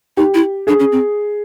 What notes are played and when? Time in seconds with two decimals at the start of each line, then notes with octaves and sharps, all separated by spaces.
0.17 D#4 G4
0.34 E4
0.67 D4 G#4
0.79 C#4
0.92 C4